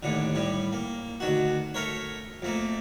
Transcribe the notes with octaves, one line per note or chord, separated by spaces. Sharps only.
D#2 A2 D3
A2 G3
A#3
D2 D#3 F#4
A3 A#4 C#5
F2 A3 A#3